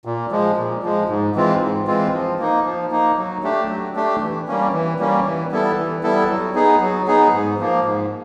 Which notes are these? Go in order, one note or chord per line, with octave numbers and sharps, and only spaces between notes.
A#2
F3 G#3
A#2
F3 G#3
G#2
E3 G#3 C4 F4
G#2
E3 G#3 C4 F4
F3
A#3 D#4
F3
A#3 D#4
F#3
A3 D4 G4
F#3
A3 D4 G4
E3
G3 A#3 C#4
E3
G3 A#3 C#4
E3
G3 B3 E4 A4
E3
G3 B3 E4 A4
F#3
B3 D#4 G#4
F#3
B3 D#4 G#4
G#2
F3 A#3
G#2